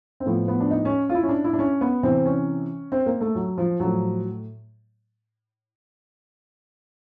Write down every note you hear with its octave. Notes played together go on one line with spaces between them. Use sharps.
C4
A2 F3 B3
B3
D4
D#4
C#4
F4
E4
C#4
D4
E4
D4
C#4
B3
C3 E3 C4
C#4
C4
A#3
A3
F#3
F3
A2 F3 F#3